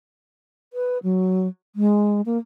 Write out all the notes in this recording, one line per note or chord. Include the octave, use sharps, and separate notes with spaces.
B4
F#3
G#3
A#3